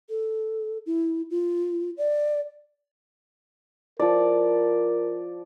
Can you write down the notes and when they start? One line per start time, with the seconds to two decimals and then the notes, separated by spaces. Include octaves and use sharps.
0.09 A4
0.86 E4
1.30 F4
1.97 D5
4.00 F3 A#4 D5